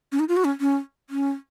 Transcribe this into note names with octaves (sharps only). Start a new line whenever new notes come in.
C#4
D#4
F4
F#4
C#4
C#4
C#4